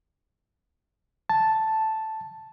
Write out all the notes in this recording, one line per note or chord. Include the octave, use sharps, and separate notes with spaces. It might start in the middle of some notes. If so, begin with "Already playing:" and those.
A5